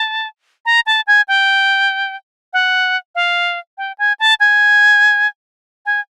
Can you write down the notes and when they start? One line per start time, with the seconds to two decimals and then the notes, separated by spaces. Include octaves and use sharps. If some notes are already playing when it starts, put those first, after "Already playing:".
Already playing: A5
0.65 A#5
0.86 A5
1.07 G#5
1.28 G5
2.53 F#5
3.15 F5
3.78 G5
3.98 G#5
4.20 A5
4.40 G#5
5.86 G#5